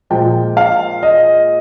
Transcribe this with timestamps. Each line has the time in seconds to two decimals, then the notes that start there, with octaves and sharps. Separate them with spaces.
0.10 A#2 F3 G#3 G5
0.57 F5
1.03 D#5